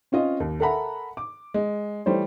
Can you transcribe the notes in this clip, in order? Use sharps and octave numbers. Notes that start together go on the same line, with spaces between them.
C4 C#4 F4 D#5
D#2
A4 A#4 E5 F#5 A#5 B5
D6
G#3
E3 G3 A3 C5 C#5